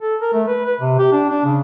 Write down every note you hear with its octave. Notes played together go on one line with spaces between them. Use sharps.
A4
A#4
A3
B4
B4
C3
G4
D4
D4
C#3